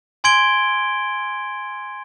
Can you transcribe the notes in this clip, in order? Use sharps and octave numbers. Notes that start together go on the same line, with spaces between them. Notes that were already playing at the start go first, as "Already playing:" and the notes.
G#5 C6 G#6 D7 G7